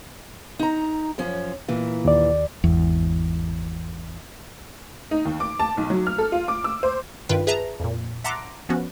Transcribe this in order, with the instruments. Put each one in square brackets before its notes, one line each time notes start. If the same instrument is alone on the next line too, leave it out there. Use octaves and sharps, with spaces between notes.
[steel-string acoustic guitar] D#4 A#5
F#2 F3 C#4
A#2 E3
[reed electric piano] D#2 D5
[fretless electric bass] G#1 E2
[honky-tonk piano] D#4
D#2
D6
A5
B1
F#3
F6
A4
F4
D6
E6
C5
[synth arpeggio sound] G2 D#3 F4 B4 G5
G#4 B4 E5 A5 A#5
F2 A#2
E5 F#5 A5 A#5 C6 D6
F3 B3 C#4 F#4